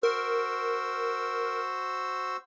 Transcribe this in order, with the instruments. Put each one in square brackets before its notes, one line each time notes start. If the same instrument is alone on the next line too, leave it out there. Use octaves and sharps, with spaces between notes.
[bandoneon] F#4 C5 E6 [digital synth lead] A#4